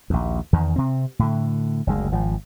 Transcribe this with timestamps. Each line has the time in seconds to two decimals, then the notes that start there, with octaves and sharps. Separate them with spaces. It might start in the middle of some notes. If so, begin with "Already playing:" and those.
0.10 A#1 D#2
0.53 E2 D#3
0.76 C3 C4
1.19 A2 D3
1.87 F#1 D2 G#3
2.12 G#1 F3